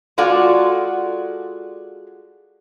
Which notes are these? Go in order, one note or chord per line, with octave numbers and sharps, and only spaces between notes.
G#3 F4 F#4 A4 D5